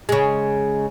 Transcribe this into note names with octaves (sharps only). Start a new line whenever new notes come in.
C#3 G#3